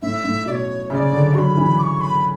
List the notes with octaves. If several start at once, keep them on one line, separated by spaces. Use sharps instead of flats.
A2 E5
A2
B2 D5
C#5
C#3 D5 E5
D3
F#3 B5 C#6
E3
D6
C#6
B5